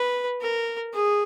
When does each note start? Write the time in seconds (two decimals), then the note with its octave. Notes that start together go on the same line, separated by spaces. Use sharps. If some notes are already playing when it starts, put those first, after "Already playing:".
Already playing: B4
0.41 A#4
0.94 G#4